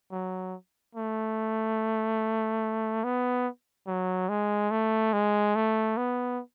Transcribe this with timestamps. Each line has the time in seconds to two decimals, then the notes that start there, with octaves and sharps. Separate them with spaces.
0.11 F#3
0.95 A3
3.04 B3
3.87 F#3
4.29 G#3
4.71 A3
5.13 G#3
5.55 A3
5.97 B3